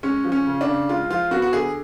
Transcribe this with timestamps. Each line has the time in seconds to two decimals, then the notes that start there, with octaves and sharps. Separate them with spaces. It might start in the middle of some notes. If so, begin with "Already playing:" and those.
0.03 G#3 C#4
0.24 F3
0.32 C#4
0.46 C#3
0.61 D4
0.67 C#3
0.89 G#3 F4
1.10 F3 F4
1.31 B3 F#4
1.42 F#4
1.53 D3 G#4